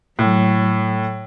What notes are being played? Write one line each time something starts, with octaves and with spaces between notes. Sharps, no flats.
A2 F#3